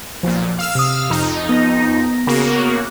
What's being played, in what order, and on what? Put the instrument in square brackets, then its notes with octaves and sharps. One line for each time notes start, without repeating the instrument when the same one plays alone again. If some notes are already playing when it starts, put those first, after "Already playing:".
[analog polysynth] B1 A#2 [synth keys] F3
[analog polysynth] F5 E6 F6
[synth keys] C3 D#6
[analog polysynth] F2 D#4
[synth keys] B3 A#6
[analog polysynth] C#3 A#3 F#4